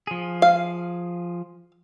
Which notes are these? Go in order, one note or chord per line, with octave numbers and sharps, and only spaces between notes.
F3 G#4
F5